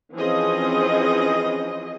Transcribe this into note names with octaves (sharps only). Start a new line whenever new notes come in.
E3 F3 C4 C#4 G#4 D#5